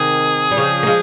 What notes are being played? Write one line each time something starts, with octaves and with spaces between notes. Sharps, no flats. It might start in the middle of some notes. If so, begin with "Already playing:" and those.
Already playing: C3 D#3 G#4
G3
C#3 F3
A#3
F3 G#3